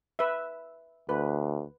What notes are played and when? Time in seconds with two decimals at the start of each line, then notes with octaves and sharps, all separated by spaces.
0.19 B4 E5
1.09 D2 B4